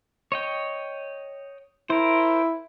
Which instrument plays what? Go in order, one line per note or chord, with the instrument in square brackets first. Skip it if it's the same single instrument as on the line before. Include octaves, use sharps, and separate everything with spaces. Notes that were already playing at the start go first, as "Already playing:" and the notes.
[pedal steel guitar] C#5 D#5 G5
[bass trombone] E4 [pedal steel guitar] A#4 C5